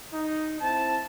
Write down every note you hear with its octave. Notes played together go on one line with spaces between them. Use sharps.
D#4
C4 E4 A5